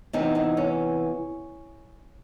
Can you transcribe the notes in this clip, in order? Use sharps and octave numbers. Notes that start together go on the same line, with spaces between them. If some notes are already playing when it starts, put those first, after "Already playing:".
E2 C3 E3 C4 D#4
C4 D#4
C#4